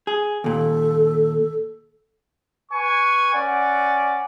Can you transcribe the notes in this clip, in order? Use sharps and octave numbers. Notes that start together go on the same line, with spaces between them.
G#4
D#2 A#2 A4
B4 G#5 C#6
C#4 D5 F#5 G#5